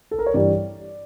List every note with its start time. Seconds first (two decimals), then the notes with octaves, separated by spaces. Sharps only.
0.11 A4
0.19 A#4
0.26 C#5
0.34 G2 E3 G3 D5